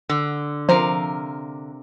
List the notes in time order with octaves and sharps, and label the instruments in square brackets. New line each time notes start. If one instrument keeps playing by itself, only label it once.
[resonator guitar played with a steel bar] D3
[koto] C3 A#4 F5 [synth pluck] F3